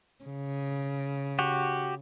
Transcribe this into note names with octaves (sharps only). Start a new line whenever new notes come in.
C#3
F#4 G4